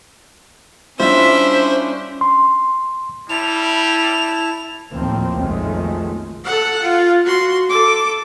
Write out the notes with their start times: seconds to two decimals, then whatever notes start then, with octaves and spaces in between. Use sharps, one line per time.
1.00 G3 C#4 D4 E4 F4 C5 E5
2.21 C6
3.30 G3 E4 A5 F7
4.92 D#2 A2 F3 A#3 C4
5.39 B1 F2 D#3 G#3 A3
6.45 A4 F#5
6.83 F4
7.25 F#4 C6
7.69 A4 D6